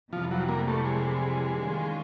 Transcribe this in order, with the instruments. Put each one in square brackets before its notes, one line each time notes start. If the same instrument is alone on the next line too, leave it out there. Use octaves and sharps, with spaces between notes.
[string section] F2 C3 E3 G3 [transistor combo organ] F3
[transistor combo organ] F#3
A#3
A3
G#3
[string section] D#3 G3 A#3 C#4 F4